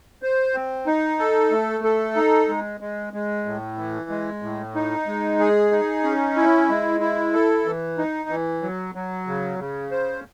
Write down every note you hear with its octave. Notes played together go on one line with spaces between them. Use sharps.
C5
C4
D#4
A4
A3
A4
D#4
G#3
G#3
G#3
A2
E3
G#3
A2
D#4
G#3
G#4
D#4
C#4
E4
G#3
E4
A4
E3
D#4
E3
F#3
F#3
C#3
C#3
C5